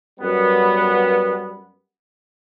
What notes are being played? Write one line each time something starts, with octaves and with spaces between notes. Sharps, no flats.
F#2 G3 B3